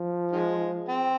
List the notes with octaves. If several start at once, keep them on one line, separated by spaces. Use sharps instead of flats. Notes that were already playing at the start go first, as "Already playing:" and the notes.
Already playing: F3
D#3 G#3
C4